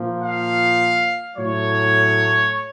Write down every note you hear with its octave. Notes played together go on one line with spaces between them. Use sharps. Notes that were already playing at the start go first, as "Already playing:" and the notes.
Already playing: A#2 F3 A#3
F5
A2 F#3 A3 C#5